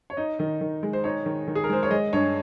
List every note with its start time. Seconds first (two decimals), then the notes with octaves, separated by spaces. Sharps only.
0.10 C#5
0.17 D#4 D#5
0.39 D#3 D#5
0.61 D#3
0.83 G#3
0.93 C5
1.04 D#4 C#5
1.26 D#3
1.48 D#3
1.55 G#4
1.64 A#4
1.70 G#3 C5
1.83 C#5
1.91 G#3 D#5
2.13 G2 C#5